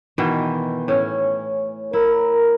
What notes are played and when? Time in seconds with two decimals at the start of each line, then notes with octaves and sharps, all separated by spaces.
0.18 B2 D#3 E3
0.88 A2 C#4
1.93 E4 A#4